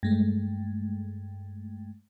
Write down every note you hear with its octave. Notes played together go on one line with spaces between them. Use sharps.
G2 G#3 A3